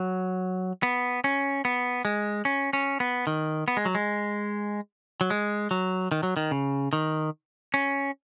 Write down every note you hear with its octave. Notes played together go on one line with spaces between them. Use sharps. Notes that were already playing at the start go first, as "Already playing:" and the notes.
Already playing: F#3
B3
C#4
B3
G#3
C#4
C#4
B3
D#3
B3
G#3
F#3
G#3
F#3
G#3
F#3
D#3
F#3
D#3
C#3
D#3
C#4